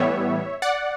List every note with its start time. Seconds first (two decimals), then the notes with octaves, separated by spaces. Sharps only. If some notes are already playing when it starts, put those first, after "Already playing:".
Already playing: A2 E3 G3 B3 C#5 E5
0.62 D5 F#5